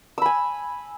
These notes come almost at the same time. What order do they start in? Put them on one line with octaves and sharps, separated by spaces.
E6 B5 G#5